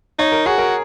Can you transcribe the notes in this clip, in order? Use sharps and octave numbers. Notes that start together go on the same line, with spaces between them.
D#4 C#5
A#4
F#4 G#4
A#4